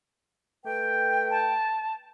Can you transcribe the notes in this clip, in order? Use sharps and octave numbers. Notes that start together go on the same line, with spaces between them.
A3 B4 G5
A5